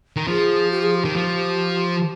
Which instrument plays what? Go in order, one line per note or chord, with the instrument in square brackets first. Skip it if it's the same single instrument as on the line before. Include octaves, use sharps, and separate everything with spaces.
[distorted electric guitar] D#3
[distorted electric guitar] F3 [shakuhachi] G#4
[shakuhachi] G4
G#4
G4
[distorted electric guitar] D#3
F3